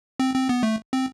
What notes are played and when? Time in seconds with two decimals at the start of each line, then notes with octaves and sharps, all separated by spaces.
0.20 C4
0.35 C4
0.49 B3
0.63 A3
0.93 C4